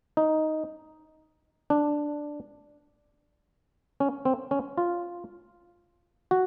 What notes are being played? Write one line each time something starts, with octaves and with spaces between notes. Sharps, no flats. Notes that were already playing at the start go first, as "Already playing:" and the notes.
D#4
D4
C#4
C4
C#4
F4
F#4